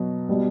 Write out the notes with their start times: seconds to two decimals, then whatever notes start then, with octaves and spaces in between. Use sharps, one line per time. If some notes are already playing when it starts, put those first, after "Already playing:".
Already playing: B2 F#3
0.29 B2 G3